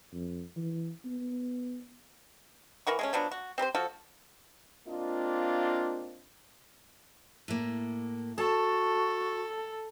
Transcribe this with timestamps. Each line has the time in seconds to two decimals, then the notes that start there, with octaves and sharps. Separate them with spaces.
0.13 F2
0.56 E3
1.05 B3
2.87 E3 A#4 F#5 C#6
2.99 G#3 A3 C#4
3.13 F3 F#3 B3 D4
3.31 F#4
3.58 C4 G4 B4 C5
3.75 F3 F#4 A4
4.88 A#3 C4 D4 F4 D#5
7.48 A2 A#3
8.38 F#4 A4 A5